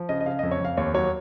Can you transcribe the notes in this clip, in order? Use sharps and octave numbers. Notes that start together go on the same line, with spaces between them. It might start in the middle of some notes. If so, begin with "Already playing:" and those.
Already playing: F3
C#3 D#5
D#5
C#3 F5
F2 D#5
C#5
F2 F5
D#2 C#5
F#3 C#5